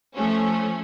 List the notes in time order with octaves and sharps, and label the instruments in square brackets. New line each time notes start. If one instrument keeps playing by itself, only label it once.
[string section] F3 A3 C#4